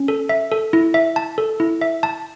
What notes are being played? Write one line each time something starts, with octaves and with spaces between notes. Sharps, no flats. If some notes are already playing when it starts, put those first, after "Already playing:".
Already playing: C#4
A4
E5
A4
E4
E5
A5
A4
E4
E5
A5